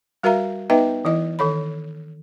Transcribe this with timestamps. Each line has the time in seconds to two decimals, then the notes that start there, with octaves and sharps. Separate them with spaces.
0.23 G3 F#4 A#4 E5 F5 A#5
0.70 B3 D#4 B4 D#5 E5 G5
1.05 E3 E4 D#5
1.39 D#3 A4 C#5 B5